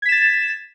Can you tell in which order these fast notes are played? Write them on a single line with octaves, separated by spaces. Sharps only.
G#6 B6 E7 A6